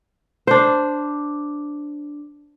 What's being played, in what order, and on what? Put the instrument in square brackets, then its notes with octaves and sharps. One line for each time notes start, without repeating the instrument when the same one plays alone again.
[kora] D4 C5